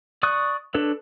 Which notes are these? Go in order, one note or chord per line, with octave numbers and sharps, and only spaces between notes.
D5 C#6 D#6 F#6
D4 A4 B4 C#5